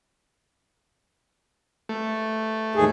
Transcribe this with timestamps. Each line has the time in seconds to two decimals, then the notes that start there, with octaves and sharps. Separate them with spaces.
1.89 A3
2.75 D#2 G#2 G#4